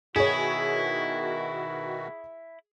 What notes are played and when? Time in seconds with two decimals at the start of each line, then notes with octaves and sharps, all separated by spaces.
0.16 B2 D#3 E4 F#4 G#4 C#5